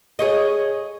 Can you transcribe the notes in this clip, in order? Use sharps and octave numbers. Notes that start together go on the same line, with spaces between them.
G#4 C#5 D#5